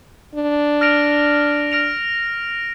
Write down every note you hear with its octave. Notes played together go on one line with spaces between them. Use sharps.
D4
F6 A#6 D7 F7
F6 A#6 D7 F7